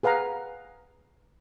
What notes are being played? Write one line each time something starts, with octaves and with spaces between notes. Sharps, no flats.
G#4 B4 F5 F#5 A#5